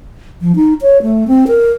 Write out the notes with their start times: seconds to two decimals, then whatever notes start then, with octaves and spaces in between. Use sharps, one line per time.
0.41 F3
0.56 D#4
0.82 C#5
1.02 A3
1.28 C4
1.47 A#4